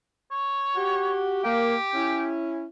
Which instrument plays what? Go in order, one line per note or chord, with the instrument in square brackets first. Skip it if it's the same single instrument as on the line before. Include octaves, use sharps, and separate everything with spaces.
[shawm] C#5
[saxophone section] F#4 G4
[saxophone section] A#3 [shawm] G4
[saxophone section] C#4 E4